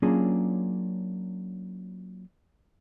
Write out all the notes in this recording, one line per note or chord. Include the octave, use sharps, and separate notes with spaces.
F#3 A#3 C#4 D4 F4 G#4